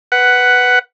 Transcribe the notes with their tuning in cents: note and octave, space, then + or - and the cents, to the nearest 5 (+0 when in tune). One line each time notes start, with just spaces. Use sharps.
B4 +0 F#5 +10